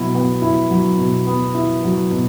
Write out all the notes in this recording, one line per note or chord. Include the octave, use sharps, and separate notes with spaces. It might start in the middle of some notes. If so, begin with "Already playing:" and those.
Already playing: B2 F#3 E4
B3
E4
F#3
B2
B3
E4
F#3
B2